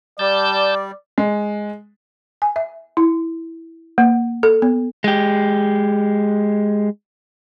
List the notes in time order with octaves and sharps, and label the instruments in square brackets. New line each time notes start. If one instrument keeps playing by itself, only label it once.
[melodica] G3 [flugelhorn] D5 [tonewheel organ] A5 G6
[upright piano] G#3
[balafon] G#5
E5
E4
A#3
A4
B3
[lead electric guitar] G#3 G4